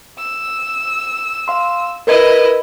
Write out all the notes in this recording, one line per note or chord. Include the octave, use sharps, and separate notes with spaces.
E6
F5 C6
E4 A#4 B4 D#5 G#6